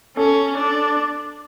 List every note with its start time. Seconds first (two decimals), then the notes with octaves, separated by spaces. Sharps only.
0.17 C#4 A4
0.57 D4